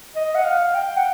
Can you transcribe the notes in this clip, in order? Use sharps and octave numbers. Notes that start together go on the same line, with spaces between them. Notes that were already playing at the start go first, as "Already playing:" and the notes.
D#5
F#5
F5
G5
F#5